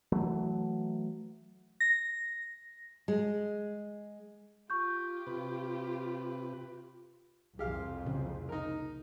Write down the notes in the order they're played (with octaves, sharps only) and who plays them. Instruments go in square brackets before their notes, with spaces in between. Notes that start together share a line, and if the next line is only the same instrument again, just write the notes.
[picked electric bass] E3 F#3 A3
[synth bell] A#6
[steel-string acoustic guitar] G#3
[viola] F4 G4 [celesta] C#6 G6
[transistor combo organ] C3 B4
[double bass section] C2 F2 [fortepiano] G4 F5 [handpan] G#4
[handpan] A#2 C#3 G#4
[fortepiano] D#4 A#4